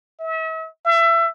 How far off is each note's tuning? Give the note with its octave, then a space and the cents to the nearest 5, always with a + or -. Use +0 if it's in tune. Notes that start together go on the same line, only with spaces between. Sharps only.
E5 -40
E5 +25